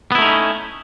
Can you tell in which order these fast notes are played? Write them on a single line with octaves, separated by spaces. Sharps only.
B3 E4 A3 D#4 C#4